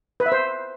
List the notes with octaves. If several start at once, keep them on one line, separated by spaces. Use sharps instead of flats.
B4
E5
C5